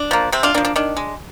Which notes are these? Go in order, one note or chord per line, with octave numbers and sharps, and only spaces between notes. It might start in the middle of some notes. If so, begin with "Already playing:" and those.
Already playing: D4
F3 A#3
C3 C4
D4 F4
F3 A#3 D4
D4
D#3 D4
G#3